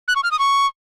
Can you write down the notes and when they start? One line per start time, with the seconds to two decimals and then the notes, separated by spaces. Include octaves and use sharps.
0.08 F#6
0.16 C#6
0.24 F6
0.31 D#6
0.39 C#6